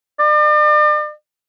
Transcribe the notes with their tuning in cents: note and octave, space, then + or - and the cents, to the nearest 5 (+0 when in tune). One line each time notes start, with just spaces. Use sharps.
D5 +40